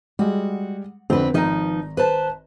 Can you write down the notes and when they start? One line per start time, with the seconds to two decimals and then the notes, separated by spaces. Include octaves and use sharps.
0.19 G3 G#3 F#4
1.10 F2 D3 C4 B4
1.34 G#1 F3 D#4 A#5
1.97 B4 C5 A5